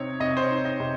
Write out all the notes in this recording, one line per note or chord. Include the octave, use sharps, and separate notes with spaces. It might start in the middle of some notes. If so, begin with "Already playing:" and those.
Already playing: C3 C4 D#4 C#5
C3 D#5
C5
C#5
D#4
D#5
C3